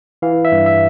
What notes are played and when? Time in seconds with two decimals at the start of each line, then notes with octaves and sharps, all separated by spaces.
0.22 E3 F5
0.45 E5
0.52 G2
0.66 E5